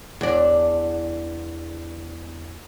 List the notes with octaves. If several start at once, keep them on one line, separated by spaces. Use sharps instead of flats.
E2 D4